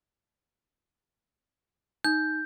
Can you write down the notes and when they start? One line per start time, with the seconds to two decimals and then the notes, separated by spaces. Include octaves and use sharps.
2.04 D#4 G6